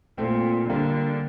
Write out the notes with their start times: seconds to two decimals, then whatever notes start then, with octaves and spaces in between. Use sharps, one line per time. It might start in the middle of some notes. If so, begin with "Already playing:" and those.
0.18 A#2 A3 C4
0.69 D3 G3 A#3